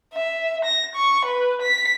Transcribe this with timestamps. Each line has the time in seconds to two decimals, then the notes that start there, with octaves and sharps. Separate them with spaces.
0.14 E5
0.65 A#6
0.96 C#6
1.25 B4
1.62 B6